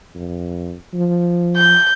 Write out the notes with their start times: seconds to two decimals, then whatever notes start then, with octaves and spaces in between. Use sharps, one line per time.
0.16 F2
0.94 F3
1.56 G6